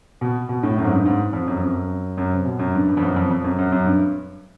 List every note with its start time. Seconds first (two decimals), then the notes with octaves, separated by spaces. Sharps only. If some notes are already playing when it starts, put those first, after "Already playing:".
0.21 B2
0.49 B2
0.63 A2
0.78 F#2
0.84 G#2
0.92 G2
1.06 G#2
1.33 F2
1.47 F#2
1.57 F2
1.66 F#2
2.17 F#2
2.32 C3
2.45 B2
2.59 F#2
2.74 G2
2.88 G2
2.97 F2
3.02 F#2
3.16 F2
3.30 F2
3.44 F#2
3.58 F#2
3.72 F#2
3.86 G2